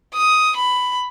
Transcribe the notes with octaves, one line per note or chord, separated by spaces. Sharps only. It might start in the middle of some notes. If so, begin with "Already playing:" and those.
D#6
B5